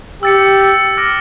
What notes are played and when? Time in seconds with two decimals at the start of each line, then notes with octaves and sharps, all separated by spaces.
0.22 G4 E6 A6 C#7
0.60 E6 A6 C#7
0.97 D6 F6 A#6 D7